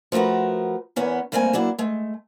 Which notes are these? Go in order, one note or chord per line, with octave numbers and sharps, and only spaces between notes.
F3 A3 F#4 A#4 B4
E2 B3 C#4 A#4
G2 A3 A#3 C4 B4 G#5
F#3 A#3 D4 E4
G#3 A3